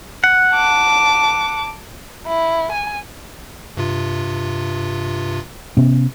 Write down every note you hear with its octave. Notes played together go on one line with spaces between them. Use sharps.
F#5
A5 D6
E4
G#5
G2 C3 F4
C3 B3 C#4